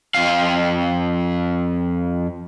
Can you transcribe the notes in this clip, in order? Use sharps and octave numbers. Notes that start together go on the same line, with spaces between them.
F2 F5